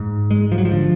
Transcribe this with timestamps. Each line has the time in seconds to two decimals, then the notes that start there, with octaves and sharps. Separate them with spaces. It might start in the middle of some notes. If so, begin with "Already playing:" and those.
Already playing: G#2
0.31 G#3
0.52 F3
0.58 F#3
0.65 F3
0.72 D3